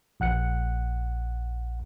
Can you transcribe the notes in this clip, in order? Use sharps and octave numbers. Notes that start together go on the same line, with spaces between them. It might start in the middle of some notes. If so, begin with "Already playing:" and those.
A#1 F#5 F#6 C#7